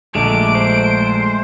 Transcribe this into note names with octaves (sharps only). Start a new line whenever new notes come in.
A#1 D3 G#3 A3 D6 D7
C5